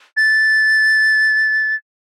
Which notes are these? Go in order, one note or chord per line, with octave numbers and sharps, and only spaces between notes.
A6